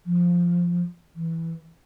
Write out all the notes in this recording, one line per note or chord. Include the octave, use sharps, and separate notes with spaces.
F3
E3